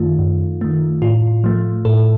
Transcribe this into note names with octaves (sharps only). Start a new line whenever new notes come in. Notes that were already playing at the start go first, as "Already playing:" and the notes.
Already playing: F#2 D#3 A3 F4
F#2
D#3 A3
A2 F4
F3 A3
A2 A4